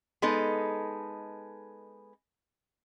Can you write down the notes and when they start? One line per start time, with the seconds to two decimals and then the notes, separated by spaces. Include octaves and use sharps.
0.22 G#3 B3 D#4 A4